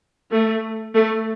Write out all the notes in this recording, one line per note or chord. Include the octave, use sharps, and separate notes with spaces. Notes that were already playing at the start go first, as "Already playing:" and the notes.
A3
A3